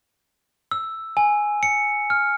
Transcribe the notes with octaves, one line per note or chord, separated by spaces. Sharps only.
E6
G#5
C#7
F6